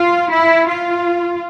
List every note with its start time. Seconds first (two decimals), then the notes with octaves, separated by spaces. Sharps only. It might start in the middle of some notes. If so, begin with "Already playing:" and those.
Already playing: F4
0.31 E4
0.68 F4